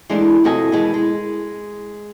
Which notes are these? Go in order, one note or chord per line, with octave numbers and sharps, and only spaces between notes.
E3 G#3 A3 B3 D4 D#4
F2 C3 F#4 A4 D#5 G#5
B2 D#3 E3 G#3 B3
G#3